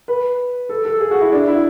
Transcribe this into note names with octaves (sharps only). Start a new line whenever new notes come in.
B4
A4
A4
G#4
F#4
E4
D4
E4